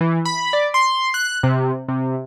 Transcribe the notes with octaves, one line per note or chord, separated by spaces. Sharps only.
E3
B5
D5
C6
F#6
C3
C3